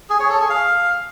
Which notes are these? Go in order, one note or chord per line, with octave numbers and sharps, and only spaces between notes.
G#4
C#5
A4
G#4
F5